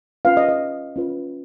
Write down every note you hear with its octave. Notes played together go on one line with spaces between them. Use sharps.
C#4 F4 B4 F5
D#5
D#5
C#4 F4 B4